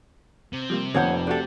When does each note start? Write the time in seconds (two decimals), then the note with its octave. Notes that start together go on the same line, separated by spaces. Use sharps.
0.53 C3
0.70 F3 G3 A#3
0.94 F1 F2 A#3 C4 C#5 F#5 G6
1.27 A3 D4 F#4 G4 A4